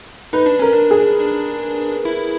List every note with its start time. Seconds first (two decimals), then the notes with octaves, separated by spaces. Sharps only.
0.33 D#4 B4
0.46 D4
0.59 C#4 A#4
0.72 D4
0.91 G#4
1.19 D4
2.05 E4